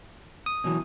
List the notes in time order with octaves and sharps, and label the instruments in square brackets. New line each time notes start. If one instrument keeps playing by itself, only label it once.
[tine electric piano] D#6
[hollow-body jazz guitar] B2 E3 F#3